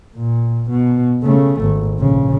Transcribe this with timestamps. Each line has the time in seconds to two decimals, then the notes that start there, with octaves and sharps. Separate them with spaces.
0.16 A#2
0.71 B2
1.23 C#3 A3
1.62 G#1
1.98 A#1 C#3